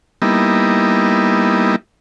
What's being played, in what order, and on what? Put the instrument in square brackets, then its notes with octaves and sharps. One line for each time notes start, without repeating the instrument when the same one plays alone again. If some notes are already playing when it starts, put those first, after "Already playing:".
[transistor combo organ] G3 A#3 B3 D#4 E4